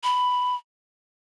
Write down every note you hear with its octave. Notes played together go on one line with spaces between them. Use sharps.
B5